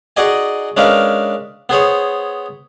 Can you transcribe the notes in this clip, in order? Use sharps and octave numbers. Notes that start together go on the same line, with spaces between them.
D#4 F#4 G#4 D5 D#5 G#5
G#3 C#4 D4 A#4 B4 F5
B3 G#4 C5 C#5